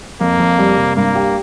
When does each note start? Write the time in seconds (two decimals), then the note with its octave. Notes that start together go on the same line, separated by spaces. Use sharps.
0.20 F2 A#3
0.40 F2
0.59 G3
0.77 C3
0.96 G2 A#3
1.15 G4